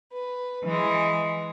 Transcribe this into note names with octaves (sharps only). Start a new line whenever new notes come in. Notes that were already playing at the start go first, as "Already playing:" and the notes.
B4
E3 G#3